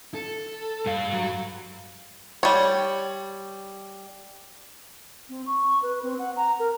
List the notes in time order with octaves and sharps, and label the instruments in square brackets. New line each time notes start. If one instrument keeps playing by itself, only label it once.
[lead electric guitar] A4
[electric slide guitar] G2 F5
[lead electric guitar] F#3
[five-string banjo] G3 C#5
[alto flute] C4
C#6
B4
C4
F#5
A#5
A#4